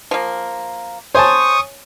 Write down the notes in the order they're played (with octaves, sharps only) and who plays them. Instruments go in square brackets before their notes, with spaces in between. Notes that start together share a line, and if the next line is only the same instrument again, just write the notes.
[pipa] F3 A#3
[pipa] C5 [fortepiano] C#5 G#5 A5 [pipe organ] C#6 D#6